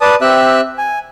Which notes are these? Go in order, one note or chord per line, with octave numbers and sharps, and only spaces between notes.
B4 D5 A5 D#6
C4 G4 E5 E6 F#6
G#5